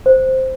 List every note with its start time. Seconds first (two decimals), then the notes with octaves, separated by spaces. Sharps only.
0.06 C5